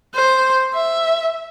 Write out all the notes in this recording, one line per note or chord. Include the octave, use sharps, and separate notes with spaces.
C5
E5